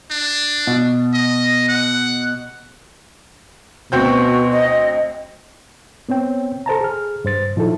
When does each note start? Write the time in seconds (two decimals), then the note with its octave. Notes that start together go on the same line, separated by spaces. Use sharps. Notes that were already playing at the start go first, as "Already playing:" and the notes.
0.10 D4
0.67 B2
1.14 D#5
1.68 F#5
3.92 D2 B2 C4 F#4 G6
4.51 D#5
6.09 B3 C4 C#5 G5
6.66 A4 C5 A5 A#5
6.81 G#4 F6
7.25 G2 C5 A6
7.56 A#2 F3 D#4 E4 A4